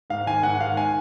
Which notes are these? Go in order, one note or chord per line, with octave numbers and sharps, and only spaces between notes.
G#2 F5
D#3 G#5
G#2 F#5
D#3 F5
G#5